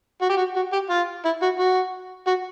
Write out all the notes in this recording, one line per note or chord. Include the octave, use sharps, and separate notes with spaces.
F#4
G4
F#4
F#4
G4
F4
E4
F#4
F#4
F#4